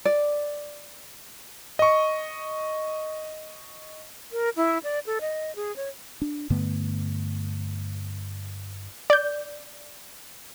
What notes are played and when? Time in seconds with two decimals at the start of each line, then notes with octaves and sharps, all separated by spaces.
0.05 D5
1.79 D#5 C#6
4.32 A#4
4.56 E4
4.84 D5
5.06 A4
5.21 D#5
5.56 G#4
5.76 C#5
6.22 D4
6.50 G2 D3 A3 B3
9.10 D5 G6